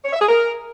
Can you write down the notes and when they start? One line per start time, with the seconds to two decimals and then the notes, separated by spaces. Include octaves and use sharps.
0.05 C#5
0.13 E5
0.21 G#4
0.29 A#4